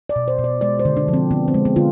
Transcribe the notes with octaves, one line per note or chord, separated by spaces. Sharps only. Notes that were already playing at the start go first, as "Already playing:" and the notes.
D5
B2
C5
B2
D5
G#3 D5
C5
D3
D4
F3
C4
D3 B3
C4
G#3
B3
D3 F4